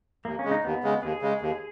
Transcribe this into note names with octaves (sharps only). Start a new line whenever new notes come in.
D#2 A#3
C#4
C#3 G#3
D#4
D#2 B3
C#3 G#3
D#2 G#4
C#3 G#3
D#2